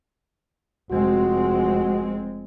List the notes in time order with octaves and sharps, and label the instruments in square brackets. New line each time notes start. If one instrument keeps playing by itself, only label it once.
[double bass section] F1 G#3 C4 [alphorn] F#4